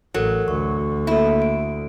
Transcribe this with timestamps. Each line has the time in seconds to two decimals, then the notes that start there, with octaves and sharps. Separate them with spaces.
0.14 A1 F#3 A4 A#4
0.48 D2 C#6
1.07 A#3 E4 A4
1.42 D7